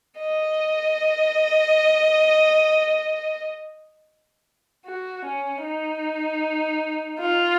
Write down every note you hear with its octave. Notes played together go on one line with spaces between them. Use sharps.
D#5
F#4
C#4
D#4
F4